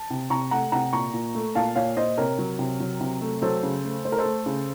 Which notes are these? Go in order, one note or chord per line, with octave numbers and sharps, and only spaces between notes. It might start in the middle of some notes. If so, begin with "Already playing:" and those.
Already playing: A5
C3
C3 A#5 C#6
A3 F#5 A#5
C3 F#5 A#5
A#2 A#5 C#6
A#2
A3
A#2 F5 A5
A#2 C#5 F5
A#2 C5 D#5
C3 A#4 C#5
F#3
C3
F#3
C3
A3
F#3 A4 C5
C#3
A3
A3 C5
A#4
A4 C5
A3
C#3